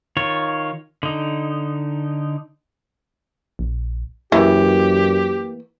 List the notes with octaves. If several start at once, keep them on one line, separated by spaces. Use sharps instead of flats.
D#3 F4 C#5
D3 D#4
A#1
F#2 E3 A#3 G4